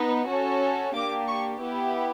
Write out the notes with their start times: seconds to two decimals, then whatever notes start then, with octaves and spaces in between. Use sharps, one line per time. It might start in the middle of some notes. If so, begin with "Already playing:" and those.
Already playing: B3 D#4
0.28 C#4 F#4 A4
0.95 A#3 D4 G4 D6
1.28 C#6
1.61 B3 E4 G4